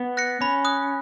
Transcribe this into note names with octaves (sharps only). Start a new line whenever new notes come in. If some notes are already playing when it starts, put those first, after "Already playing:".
Already playing: B3
F#6 A#6 C#7
C#4 B5
D#6 F#6